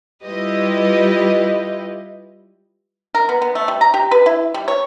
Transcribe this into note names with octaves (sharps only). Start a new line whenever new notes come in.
G3 E4 F4 G4 B4 D#5
A#4
B3
B3
A3
G3
A#5
G4
B4
E4
G3
C#5